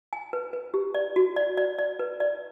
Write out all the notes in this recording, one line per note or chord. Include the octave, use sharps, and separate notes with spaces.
G#5
B4
B4
G4
D5
F#4
D5
D5
D5
B4
D5